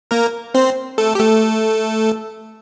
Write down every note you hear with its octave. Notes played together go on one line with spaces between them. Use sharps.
A#3 A#4
C4 C5
A3 A4
G4
A3 A4